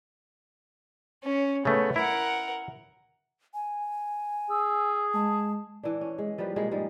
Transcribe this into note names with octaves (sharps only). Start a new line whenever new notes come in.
C#4
C#3 A3 B3
E4 A#4 F#5
G#5
G#4 E6
G#3 A5
E3 D4
C#4
G#3
F3 G3 A#3 B4
B2 F3 G#3 A#3
G#2 F3 G3 G#3